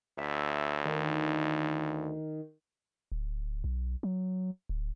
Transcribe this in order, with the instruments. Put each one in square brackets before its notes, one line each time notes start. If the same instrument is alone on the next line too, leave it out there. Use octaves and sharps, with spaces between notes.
[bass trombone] D2 [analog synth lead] E5
[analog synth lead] D#3
[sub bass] D1
B1
F#3
D1